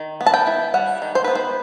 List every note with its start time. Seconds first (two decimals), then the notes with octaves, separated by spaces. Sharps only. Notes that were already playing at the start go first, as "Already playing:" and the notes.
Already playing: D#3
0.21 B3
0.26 A5
0.34 G5
0.47 E4
0.74 G3 F#5
1.02 D#3
1.15 C5
1.24 B3 B4
1.35 C5